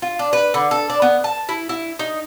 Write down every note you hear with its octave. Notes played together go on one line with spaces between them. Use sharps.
F4
D4
B4
D3
A4
D4
B3
A5
E4
E4
D#4